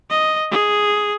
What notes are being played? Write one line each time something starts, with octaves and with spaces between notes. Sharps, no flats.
D#5
G#4